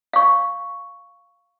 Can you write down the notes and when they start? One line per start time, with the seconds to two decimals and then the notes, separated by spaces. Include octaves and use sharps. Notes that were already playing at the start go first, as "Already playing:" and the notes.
0.13 F5 C#6